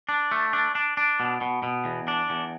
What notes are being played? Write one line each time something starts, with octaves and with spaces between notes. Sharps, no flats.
D4
A3
D4
D4
D4
B2
B2
B2
E2
D4
E2